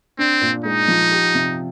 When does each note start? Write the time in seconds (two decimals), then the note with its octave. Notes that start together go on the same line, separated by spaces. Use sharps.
0.19 C4 D4
0.41 A#2
0.65 G#3 D#4
0.88 F3
1.12 G4
1.35 C3